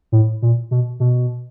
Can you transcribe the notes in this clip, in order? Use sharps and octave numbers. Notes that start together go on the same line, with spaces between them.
A2
A#2
B2
B2